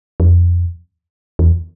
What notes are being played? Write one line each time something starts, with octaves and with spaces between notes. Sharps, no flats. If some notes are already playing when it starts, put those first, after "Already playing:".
F2
E2